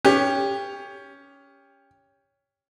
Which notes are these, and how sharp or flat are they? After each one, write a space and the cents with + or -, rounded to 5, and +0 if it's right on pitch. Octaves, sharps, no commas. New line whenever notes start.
C#4 +10 G4 +25